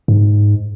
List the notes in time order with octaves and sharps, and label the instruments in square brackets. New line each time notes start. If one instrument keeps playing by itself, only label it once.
[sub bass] G#2